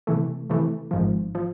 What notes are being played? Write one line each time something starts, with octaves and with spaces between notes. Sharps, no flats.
C3 E3 A3
C3 E3 A3
G#1 G#2 F3
F3